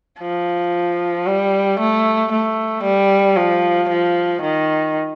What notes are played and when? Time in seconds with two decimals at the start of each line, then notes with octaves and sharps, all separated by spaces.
0.21 F3
1.26 G3
1.79 A3
2.32 A3
2.84 G3
3.36 F3
3.90 F3
4.41 D#3